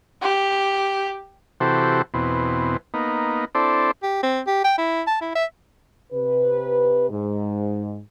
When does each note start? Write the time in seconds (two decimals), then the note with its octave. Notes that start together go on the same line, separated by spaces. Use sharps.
0.22 G4
1.60 C3 E3 F#4 G4 A4 C5
2.14 E2 B2 C4
2.94 A#3 B3 D#4
3.55 C4 D4 E4 A4 C5 D5
4.02 G4
4.23 C4
4.47 G4
4.64 G5
4.78 E4
5.07 A5
5.21 E4
5.35 E5
6.13 C3 B4
7.10 G#2